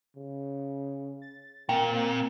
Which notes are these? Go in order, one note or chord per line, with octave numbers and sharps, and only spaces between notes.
C#3
A6
A#2 A#3 C4 G5